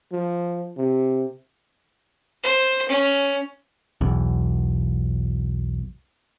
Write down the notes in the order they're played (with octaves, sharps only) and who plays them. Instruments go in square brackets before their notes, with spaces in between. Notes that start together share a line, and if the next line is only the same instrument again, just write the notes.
[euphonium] F3
C3
[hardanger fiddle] C5
C#4
[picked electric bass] B1 E2